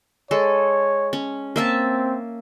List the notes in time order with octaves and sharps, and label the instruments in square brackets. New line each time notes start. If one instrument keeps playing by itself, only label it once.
[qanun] G#3 A4 [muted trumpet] C#5
[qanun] C#4
[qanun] A#3 E5 A5 [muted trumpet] C4